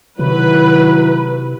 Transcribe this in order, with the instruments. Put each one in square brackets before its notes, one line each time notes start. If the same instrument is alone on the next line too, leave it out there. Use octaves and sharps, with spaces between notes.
[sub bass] C3 [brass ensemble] D#3 F#3 E4 [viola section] B4